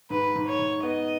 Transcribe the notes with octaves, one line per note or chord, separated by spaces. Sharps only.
G#2 B4
G#2
C#5
G#2
B3 D#5